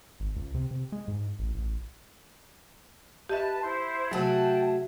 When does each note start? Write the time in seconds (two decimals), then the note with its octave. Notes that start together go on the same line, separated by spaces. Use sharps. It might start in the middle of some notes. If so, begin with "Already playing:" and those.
0.20 G#1
0.36 C#2
0.55 C3
0.71 C3
0.92 G#3
1.08 G#2
1.39 A1
1.54 A1
3.29 G4 B4 D#5 E5 A5
3.63 E4 C5
4.11 C3 F#3 A3 F#4 G#4 G5 A5